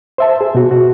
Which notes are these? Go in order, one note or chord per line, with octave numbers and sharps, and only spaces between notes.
C5 E5 A5
G#4
B2 F#4
F#4